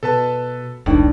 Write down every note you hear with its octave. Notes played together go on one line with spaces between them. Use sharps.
B2 A4 B4 A5
E1 C2 A2 D4 D#4 G5